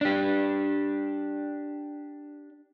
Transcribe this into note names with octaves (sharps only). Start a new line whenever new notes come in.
D4 G4